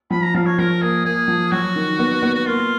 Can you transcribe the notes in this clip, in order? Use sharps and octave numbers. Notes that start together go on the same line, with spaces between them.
F3 B5
A#5
F3 F5
C#5
F3 A#4
A#3 G#4
A#3 G#4
F3
F#3 F#4
D#3
B3
B3
F#4
A#3 F4